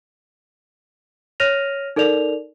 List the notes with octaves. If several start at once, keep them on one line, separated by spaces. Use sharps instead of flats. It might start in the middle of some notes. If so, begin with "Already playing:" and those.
C#5 F6 A#6 D#7 F7
D#4 A4 A#4 D5 F7